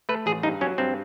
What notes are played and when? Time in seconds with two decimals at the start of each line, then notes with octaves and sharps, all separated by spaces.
0.09 A3 B4
0.26 A1 G#4
0.43 G2 D#4
0.61 F#3 C#4
0.78 G2 C4